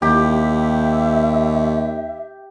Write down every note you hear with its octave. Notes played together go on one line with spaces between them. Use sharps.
D#2 G4 E5